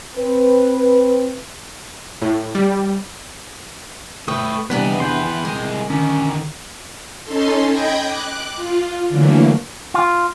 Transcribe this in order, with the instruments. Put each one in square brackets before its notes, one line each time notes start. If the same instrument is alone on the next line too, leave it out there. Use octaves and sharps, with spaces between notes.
[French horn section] C4 B4
[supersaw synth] A2
G3
[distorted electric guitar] A3 G5 [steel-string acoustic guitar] B4 [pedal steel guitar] C#6 D#6
[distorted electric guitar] E2 D#4 [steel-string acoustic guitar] C3 B3 D4 [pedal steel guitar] G3 B4
[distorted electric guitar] E2 B4 [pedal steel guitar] G5 C6
[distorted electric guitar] C2 G#3 [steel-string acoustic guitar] A#4
[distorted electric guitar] D3 D#3 [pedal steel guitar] C#4
[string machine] C#4 D#4 A4 C6
D#5 G5 B5 G6 G#6 A#6
D6 F#6
F4
D3 E3 F#3 A3 A#3
[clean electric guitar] F4